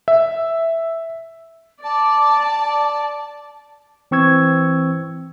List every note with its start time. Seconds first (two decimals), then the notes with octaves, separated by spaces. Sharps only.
0.08 E5
1.84 D5 A5
4.11 E3 C4 C#6 E6 G#6